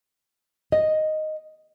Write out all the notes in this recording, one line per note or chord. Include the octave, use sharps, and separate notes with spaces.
D#5